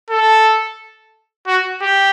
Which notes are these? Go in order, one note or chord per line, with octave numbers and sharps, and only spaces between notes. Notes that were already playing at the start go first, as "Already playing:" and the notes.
A4
F#4
G4